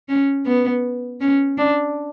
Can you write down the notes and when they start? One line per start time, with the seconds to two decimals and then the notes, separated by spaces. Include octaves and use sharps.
0.09 C#4
0.46 B3
1.21 C#4
1.58 D4